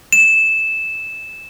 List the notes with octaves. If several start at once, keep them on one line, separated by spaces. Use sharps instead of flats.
E7